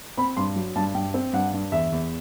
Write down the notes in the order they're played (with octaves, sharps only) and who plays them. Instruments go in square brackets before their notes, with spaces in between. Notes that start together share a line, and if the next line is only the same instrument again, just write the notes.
[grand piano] C4 B5
G2 C6
F#3
G2 A5
G2 G5
C4
G2 F#5
G2
E2 E5
E2